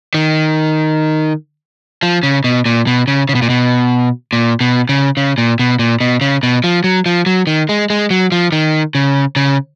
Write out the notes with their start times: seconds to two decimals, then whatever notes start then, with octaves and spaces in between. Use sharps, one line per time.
0.14 D#3
2.03 F3
2.23 C#3
2.44 B2
2.66 A#2
2.87 B2
3.08 C#3
3.29 C#3
3.35 B2
3.42 A#2
3.50 B2
4.33 A#2
4.61 B2
4.89 C#3
5.17 C#3
5.38 A#2
5.59 B2
5.79 A#2
6.00 B2
6.21 C#3
6.43 B2
6.64 F3
6.84 F#3
7.06 F3
7.26 F#3
7.47 D#3
7.69 G#3
7.90 G#3
8.10 F#3
8.32 F3
8.52 D#3
8.95 C#3
9.36 C#3